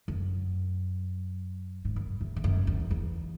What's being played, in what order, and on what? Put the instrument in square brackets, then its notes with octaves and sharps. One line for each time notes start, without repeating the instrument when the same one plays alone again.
[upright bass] F#2
G#2
F#2
E2
E2
F#2
E2
E2